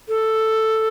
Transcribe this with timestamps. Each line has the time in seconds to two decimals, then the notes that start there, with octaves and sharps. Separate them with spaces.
0.08 A4